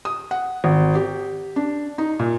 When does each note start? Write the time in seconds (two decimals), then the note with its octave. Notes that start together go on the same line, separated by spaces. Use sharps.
0.05 D#6
0.31 F#5
0.64 G#1
0.95 G4
1.56 D4
1.98 D#4
2.19 A#2